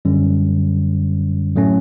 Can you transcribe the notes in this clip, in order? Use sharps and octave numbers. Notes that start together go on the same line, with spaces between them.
F#2 D3 G3 C#4
A2 F#3 A3 C#4